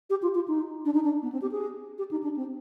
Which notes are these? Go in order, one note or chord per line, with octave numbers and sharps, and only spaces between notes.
G4
F4
F4
D#4
D4
D#4
D4
B3
C4
G4
G#4
G4
D#4
D4
C4